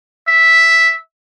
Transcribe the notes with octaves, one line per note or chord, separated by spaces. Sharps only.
E5